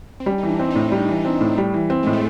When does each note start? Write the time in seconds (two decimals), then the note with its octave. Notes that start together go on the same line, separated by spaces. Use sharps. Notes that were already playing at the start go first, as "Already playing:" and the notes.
0.20 C4
0.26 G3 C#4
0.38 E3 D#4
0.49 D4
0.59 C4 D4
0.71 A2 D#4
0.92 G3
1.09 E3
1.25 C4
1.41 A2
1.58 G3
1.74 E3
1.90 C4
2.03 A2 G#3
2.13 A3